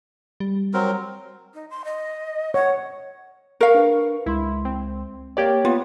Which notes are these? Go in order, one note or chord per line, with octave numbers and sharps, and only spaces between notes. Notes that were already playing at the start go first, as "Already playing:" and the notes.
G3
F#3 C4 A#4
D#4
C6
D#5
C#5 F#5
A#4 F5 C#6
D4 B4
C#2 G#3 E4 C6
C4
A#3 G4 C#5 D5 G5 G#6
B3 F4